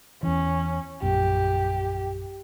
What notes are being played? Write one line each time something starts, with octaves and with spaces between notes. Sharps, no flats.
E2 E3 C#4
A#1 F#2 G4